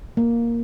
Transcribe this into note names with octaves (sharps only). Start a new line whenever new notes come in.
A#3